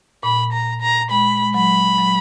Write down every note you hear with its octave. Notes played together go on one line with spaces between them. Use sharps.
A#2 B5
A#5
A#5
G#3 B5
G#3
F#3 B5
F#3